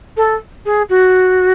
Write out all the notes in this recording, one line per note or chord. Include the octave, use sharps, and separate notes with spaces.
A4
G#4
F#4